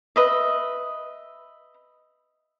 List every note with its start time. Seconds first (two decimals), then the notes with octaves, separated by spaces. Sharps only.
0.16 B4 D#5 E5